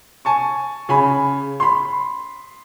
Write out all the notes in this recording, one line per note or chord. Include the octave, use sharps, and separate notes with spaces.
G#5 A5 C#6
C#3 G#5 B5
B5 C6